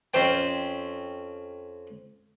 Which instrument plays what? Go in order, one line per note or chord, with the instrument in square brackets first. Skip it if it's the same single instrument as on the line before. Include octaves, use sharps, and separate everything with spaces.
[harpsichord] F2 C#4 C5 G5